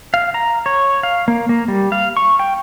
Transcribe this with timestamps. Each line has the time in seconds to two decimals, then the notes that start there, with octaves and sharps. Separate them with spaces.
0.14 F5
0.34 A#5
0.66 C#5
1.03 F5
1.28 A#3
1.49 A#3
1.68 G3
1.92 F5
2.17 C#6
2.39 G5